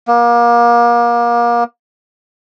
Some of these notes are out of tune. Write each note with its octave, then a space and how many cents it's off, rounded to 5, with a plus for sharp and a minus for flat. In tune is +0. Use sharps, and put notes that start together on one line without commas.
A#3 +30